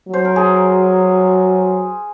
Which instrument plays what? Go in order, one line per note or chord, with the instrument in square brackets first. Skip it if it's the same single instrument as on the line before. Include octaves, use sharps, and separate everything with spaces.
[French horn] F#3
[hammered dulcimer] C5
A#4
G#4